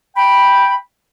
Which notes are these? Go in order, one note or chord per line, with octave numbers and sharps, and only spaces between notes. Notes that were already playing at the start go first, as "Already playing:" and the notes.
G5 B5